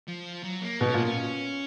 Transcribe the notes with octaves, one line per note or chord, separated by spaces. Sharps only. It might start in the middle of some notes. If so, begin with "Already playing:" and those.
F3
F#3
A#3
B2 D#4
C#4
A#2 B3
C#4